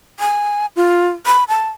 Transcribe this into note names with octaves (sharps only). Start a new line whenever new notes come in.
G#5
F4
B5
A5